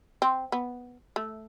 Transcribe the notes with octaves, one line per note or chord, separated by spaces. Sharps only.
C4
B3
A3